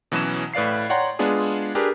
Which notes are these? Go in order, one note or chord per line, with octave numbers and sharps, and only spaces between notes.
B2 E3 F#3 B3 C#4 E7
A2 B4 D5 F5 C7
C#5 D5 F#5 G5 A#5 C6
G#3 B3 D4 F4 G#4
D4 G4 G#4 A#4 B4